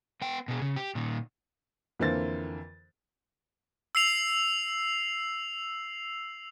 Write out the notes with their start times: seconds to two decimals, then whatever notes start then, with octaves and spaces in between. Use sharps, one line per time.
0.22 B3 G5
0.48 B2 G#4
0.62 C#3
0.76 G4
0.95 A#2 D#3
1.99 F2 D3 E3 A#3 C5 A6
3.95 E6 C7 F7